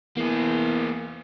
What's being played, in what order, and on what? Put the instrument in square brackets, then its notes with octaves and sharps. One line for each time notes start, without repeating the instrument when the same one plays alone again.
[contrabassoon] E2 [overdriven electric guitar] A#3 G#4